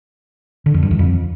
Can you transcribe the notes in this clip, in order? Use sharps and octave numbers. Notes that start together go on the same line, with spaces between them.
D3
F2
G2
E2
F2